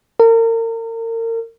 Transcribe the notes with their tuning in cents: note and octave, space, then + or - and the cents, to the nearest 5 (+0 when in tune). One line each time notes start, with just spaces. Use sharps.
A#4 -35